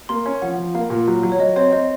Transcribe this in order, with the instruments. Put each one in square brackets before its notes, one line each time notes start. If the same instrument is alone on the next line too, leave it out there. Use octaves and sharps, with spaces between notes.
[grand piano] A#3 [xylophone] C6
[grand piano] C#4
[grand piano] F3 [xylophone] F#5
[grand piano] F3
[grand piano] A#3 [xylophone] F5
[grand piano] A#2
F#3
F#3
[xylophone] C#5
[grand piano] F#3 [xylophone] D#5
[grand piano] C4 [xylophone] C#5
[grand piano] C4 [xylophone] D#5